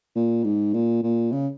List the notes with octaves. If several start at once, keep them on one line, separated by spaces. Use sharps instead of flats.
A#2
G#2
A#2
A#2
C#3